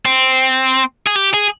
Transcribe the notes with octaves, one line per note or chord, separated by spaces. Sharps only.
C4
G#4
G4
G#4